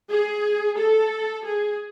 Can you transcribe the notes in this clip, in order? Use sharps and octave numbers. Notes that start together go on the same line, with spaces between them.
G#4
A4
G#4